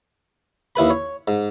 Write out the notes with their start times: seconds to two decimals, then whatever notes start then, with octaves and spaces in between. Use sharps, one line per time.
0.76 D#2 E4 B4 B5
0.90 C#5
1.28 G#2